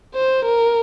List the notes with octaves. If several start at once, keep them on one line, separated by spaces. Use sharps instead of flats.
C5
A#4